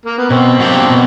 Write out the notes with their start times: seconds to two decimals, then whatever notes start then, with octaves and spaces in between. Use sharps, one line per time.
0.06 A#3
0.18 B3
0.30 B2 C4
0.60 F#3 A#3 D4 G4
0.90 B2